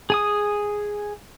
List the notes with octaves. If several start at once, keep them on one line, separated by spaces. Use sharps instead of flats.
G#4 G#5 D#6